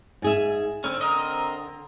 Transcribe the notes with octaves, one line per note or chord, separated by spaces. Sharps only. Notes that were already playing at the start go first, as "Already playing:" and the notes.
G#2 G#4 E5
D3 C4 C#4
C4 A#4 D#5